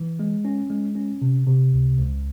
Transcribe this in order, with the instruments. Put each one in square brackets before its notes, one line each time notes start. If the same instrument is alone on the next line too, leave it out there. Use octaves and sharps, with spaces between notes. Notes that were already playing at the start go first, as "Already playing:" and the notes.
Already playing: [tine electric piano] E3
G#3
C#4
G#3
C#4
C3
C3
C#2
C#2